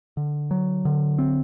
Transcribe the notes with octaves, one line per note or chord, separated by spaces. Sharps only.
D3
F#3
D3
C4